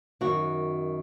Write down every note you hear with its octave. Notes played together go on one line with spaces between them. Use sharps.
F#2 D#3 F#4